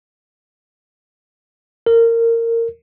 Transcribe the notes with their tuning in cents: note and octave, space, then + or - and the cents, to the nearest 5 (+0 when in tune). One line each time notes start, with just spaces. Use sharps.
A#4 -20